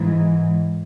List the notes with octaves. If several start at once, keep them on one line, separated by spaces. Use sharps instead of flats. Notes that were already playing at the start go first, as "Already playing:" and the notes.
Already playing: G#2 E3